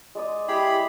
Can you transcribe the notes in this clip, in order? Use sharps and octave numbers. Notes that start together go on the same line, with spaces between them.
G#3 D5 D#6
G#3 E4 G4 G#4 B5